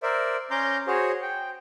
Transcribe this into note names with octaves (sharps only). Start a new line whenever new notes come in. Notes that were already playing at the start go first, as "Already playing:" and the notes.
A#4 C5 D5 E5
C#4 A#5 C6 D6 G6
F#4 G#4 C5 C#5
G5